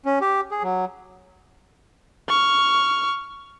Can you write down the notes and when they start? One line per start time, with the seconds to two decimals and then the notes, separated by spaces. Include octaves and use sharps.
0.05 C#4
0.21 G4
0.51 G#4
0.63 F#3
2.29 C#6 F6